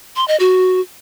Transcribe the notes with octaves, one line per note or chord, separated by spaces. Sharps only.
C6
D#5
F#4